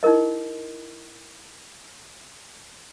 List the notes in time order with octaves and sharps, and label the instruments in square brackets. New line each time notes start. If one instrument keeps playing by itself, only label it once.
[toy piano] D#4 E4 G#4 A#4 D#5